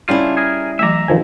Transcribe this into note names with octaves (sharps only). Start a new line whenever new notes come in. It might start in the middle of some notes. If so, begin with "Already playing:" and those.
C#3 G3 C#4 D4 E4 F4
G#4 A#4
E3 F#3 A3 E5 A#5
D#3 F3 G#5